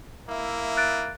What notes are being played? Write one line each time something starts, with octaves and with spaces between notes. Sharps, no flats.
A#3 E4 E5
F#6 A6 D7